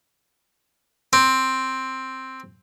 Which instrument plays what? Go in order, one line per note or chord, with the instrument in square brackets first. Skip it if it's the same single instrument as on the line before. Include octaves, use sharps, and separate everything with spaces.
[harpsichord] C4